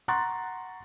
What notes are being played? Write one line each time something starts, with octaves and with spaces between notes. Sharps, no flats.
F#5 A#5 C6 C#6 F#6 A6